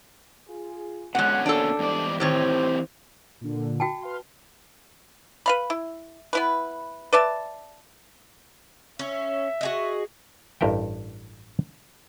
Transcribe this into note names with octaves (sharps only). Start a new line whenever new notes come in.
F4 G#4
B2 D3 G#3 C#4 F#5
A#3 D4 A4
E2 G#2 E3 G3 D5
A2 D#3 E3 C4 G4 C5 C#5
A#2 D3
F#4 G5 A5
B4 F5 C6
B4 F5 B5
E4
B3 E4 B4
B4 D5 E5 A5
C#4 E5
F#4 G#4 D#5
A1 G2 A#4 E5 G5